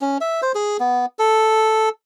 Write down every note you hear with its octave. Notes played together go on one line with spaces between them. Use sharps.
C#4
E5
C5
G#4
B3
A4